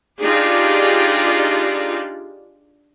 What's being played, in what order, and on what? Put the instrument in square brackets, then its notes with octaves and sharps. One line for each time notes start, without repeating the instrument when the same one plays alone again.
[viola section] D4 D#4 F4 G4 G#4 D5